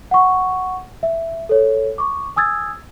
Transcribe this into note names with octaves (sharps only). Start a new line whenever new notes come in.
F#5 C#6
E5
A4 C#5
C#6 D6
G#5 D#6 E6 G#6 A6